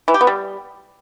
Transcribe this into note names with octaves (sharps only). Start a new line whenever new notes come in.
E3
G4
B3
G3